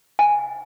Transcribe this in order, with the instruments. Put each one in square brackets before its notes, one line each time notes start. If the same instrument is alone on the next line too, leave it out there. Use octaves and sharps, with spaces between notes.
[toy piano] G#5